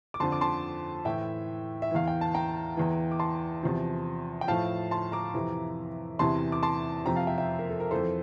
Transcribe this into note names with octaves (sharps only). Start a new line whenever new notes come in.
D6
F2 D3 F3 A5 C6
D6
A5 C6
A2 E3 E5 G5
E5
E2 E3 F5
G5
A5
G5 A#5
E2 E3
D6
A5 C6
E2 C3 F3
G5
A2 F3 F5 A5
A5 C6
A#5 D6
F2 C3 E3
E2 C3 E3 A5 C6
D6
A5 C6
F2 C3 F3 G5 A#5
F5 A5
E5 G5
E5 G5
A#4
A4
A#4
F2 E3 A4 C5